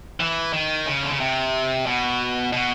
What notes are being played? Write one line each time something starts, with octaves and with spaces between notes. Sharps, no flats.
E3
D#3
C#3
D3
C#3
C3
B2
B2